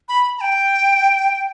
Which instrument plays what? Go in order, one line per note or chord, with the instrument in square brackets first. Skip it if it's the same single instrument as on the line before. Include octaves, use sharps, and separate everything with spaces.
[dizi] B5
A#5
G5